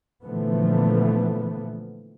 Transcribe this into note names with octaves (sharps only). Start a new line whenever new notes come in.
A#2 D3 E3 F3 A3 B3